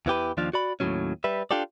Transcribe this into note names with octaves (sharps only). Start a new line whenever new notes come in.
E2 E3 G4 B4
D#2 F3 D4 F4 F5
F#4 D5 B5
D#2 A2 C3 F3 F#3 C#4
G3 B4 E5
D4 F4 G4 A4 D5